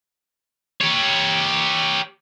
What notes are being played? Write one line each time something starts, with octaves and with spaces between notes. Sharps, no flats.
G4 C#5